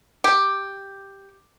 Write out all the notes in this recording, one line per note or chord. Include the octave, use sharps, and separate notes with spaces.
G4